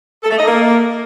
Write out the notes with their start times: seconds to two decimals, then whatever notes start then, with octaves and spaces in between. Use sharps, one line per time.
0.24 A4
0.31 A3
0.38 D#5
0.45 A#3